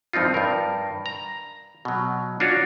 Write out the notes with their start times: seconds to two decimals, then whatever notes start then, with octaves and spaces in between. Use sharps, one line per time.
0.13 G2 F3 C4 D#4 F4
0.34 G2 A#4
1.06 A#5
1.85 B2 F#3
2.40 D4 F4 F#4 C#5